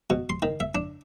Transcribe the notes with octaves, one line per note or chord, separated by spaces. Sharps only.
B2
C6
D#3
E5
D4